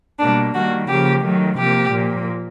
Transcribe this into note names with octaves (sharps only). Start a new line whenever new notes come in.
B2 G3 A#3 D4
D#3 G3 A#3 F#4
C#3 F3 A#3 G4
D#3 F#3 A3
C3 F3 A#3 G4
A#2 F3 A#3